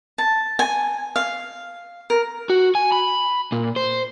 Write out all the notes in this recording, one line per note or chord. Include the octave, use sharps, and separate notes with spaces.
A5
G#5
F5
A#4
F#4
G#5
B5
A#2
C5